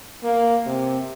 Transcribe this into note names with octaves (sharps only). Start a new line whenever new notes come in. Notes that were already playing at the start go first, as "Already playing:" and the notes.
A#3
C3